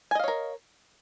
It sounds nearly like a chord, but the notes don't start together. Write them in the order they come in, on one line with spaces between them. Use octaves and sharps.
G#5 D#5 F5 C#5 A#4